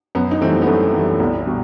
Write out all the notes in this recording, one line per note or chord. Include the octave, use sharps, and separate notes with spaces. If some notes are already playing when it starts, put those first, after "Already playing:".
F#2 B3
D#4
E3 G3 A3 C4
B3
F#2 A3 C4
E3 G3 A3
C2 B3
B2 G3